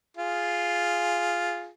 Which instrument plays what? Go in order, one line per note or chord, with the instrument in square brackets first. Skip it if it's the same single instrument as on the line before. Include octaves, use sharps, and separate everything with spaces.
[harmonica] F4 G#4